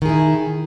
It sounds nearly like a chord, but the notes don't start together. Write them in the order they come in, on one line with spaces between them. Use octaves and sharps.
D#3 G#4 E4